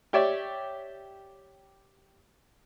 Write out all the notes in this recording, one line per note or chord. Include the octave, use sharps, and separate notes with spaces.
G4 C#5 D5 E5